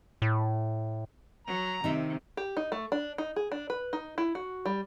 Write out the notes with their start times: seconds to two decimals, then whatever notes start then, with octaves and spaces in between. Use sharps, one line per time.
0.22 A2
1.47 F#3 A#5
1.84 C3 D#3 D#4 E5
2.37 G4
2.57 D#4
2.72 A3
2.92 D4
3.18 D#4
3.36 G#4
3.52 D4
3.70 B4
3.93 D#4
4.18 E4
4.35 F#4
4.65 G3